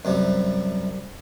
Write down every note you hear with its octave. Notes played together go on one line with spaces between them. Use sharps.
F#2 C3 G3